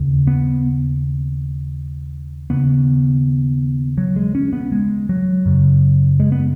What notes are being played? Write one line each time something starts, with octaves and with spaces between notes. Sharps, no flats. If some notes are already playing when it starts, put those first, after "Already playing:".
Already playing: D#2 C#3
B3
D#2 C#3 B3
F#3
G#3
C#4
B3
G#3
F#3
F#2 C#3
G#3
B3